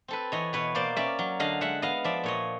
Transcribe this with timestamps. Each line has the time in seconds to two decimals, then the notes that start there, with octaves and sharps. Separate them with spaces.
0.08 C4 A4 B4
0.32 E3 C#5 D#5
0.53 B2 B4 C#5
0.75 A#3 C5 D5
0.96 C#4 D5 E5
1.19 F#3
1.40 D3 D#5 F5
1.61 G#3 E5 F#5
1.82 B3 D#5 F5
2.04 F3 D5 E5
2.23 A#2 C#5 D#5